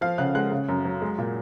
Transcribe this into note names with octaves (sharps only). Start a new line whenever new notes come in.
F3 F5 F6
C#3 F#5 F#6
G#3 F#5 F#6
C#3
F#2
F#3
G#3
A#2